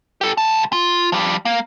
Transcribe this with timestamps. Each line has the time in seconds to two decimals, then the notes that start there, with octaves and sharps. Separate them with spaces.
0.21 G4 A4
0.38 C2 A5
0.73 F4
1.12 F3 G3
1.45 A#3